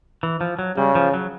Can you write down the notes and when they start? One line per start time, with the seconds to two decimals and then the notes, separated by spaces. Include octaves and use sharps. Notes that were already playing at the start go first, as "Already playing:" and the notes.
0.23 E3
0.41 F3
0.59 F#3
0.77 C#3 G3
0.95 F3
1.14 F#3